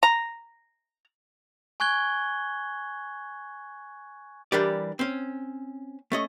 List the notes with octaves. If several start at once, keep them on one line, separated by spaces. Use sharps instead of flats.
A#5
G#5 C#6 F#6 G#6 G7
E3 G3 D4 G4 A#4 D5
C4 C#4
A3 C#4 D#5